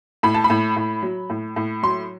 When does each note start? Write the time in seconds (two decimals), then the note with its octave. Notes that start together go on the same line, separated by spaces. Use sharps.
0.23 A2 B5
0.34 A5
0.44 B5
0.50 A2
0.76 A2
1.03 F#3
1.30 A2
1.56 A2
1.83 F#3 C6